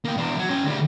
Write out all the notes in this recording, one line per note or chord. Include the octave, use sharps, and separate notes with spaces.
A#3 G5
E2 D4
F#3
C#4 G5
D2 G3